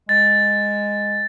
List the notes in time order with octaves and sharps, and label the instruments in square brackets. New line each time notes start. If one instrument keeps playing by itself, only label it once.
[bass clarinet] G#3 [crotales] A6